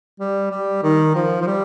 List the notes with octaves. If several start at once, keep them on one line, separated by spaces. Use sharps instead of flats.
G3
G3
D#3
F3
F3
G3